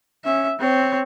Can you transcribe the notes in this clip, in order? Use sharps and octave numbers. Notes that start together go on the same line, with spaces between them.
C#4 E5
C4 C#5